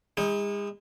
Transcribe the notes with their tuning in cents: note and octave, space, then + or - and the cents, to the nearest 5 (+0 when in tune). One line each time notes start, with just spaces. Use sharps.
G#3 -35 D#4 +30